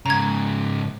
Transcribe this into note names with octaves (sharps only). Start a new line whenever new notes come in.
G#2 C#3 A#5 G#6